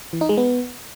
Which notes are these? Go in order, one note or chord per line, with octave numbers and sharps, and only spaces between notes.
E3
D#4
G#3
B3